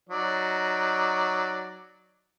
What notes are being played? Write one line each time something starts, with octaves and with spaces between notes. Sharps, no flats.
F#3 D#4 D5